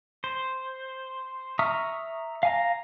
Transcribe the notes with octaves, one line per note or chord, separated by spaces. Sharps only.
C5
E5 A#5 C#6 D#6 F6
F5 G#5 A#5